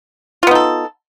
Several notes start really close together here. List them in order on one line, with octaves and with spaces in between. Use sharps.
F4 B3 D#4 A4